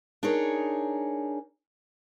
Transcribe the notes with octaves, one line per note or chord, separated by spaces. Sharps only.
D4 D#4 G#4 A#4 C#5